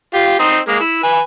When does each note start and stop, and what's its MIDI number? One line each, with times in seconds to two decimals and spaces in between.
0.14 0.38 65
0.14 0.38 67
0.39 0.58 60
0.39 0.58 63
0.68 0.79 56
0.68 0.79 58
0.81 1.03 64
1.03 1.20 71
1.03 1.20 80